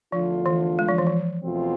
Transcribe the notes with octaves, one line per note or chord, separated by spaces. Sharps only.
E2 D3 F3 A3 D4 F4
E3
G#3
F3
E3
F3
E2 B2 A3 C4 F4